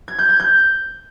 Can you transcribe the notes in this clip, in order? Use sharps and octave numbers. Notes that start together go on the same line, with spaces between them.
G#6
G6
G#6
G6